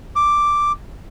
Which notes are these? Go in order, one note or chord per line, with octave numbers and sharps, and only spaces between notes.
D6